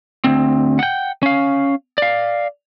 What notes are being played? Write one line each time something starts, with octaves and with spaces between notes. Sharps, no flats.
D2 C4
F#5 G5
C#4 F5
D5 F5